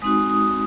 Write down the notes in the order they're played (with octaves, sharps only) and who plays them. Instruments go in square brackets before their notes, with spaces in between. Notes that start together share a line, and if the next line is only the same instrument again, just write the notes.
[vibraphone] G#3 C4 D#4 F#4 D#6
D#6